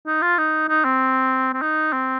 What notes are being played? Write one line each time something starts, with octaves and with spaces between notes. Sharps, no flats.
D#4
F4
D#4
D#4
C4
C4
D#4
C4